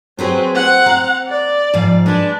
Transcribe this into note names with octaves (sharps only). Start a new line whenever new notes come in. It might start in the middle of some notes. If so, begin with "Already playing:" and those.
F#3 C4 G#4 B4 C5
C4 F#5
F5 A#5
D5
G#2 F3 F5
G#3 D4 B4